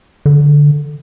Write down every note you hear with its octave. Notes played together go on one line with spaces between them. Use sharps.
D3